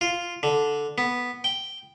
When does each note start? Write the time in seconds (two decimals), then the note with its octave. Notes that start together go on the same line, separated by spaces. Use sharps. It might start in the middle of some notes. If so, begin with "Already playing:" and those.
0.01 F4
0.43 D3
0.98 B3
1.44 G5